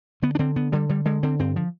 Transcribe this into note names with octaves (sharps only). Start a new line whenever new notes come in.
D3 B3
D4
D3 C4
D3 B3
D3 G3
D3 G3
D3 G#3
D3 C4
G2 C4
F3